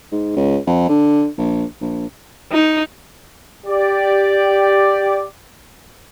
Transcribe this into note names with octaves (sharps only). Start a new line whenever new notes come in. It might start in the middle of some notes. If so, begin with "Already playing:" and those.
G#2
C#2
F2
D3
A#1
A#1
D#4
G4 D5